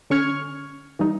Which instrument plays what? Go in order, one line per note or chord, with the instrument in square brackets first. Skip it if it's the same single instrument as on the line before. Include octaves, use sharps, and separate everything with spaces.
[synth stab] D3 C#4 C#6 F6 G#6
E3 G3 D#4